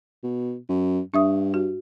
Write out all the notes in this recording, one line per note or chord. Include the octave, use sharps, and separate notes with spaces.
B2
F#2
G2 D4 E5 D#6
F#4